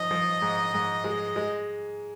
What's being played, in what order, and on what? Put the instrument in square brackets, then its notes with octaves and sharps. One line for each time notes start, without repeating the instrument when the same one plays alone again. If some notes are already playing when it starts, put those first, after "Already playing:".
Already playing: [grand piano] F3 D#4 [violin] D#5
[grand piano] F3
G#2
G#2
G#3
G#3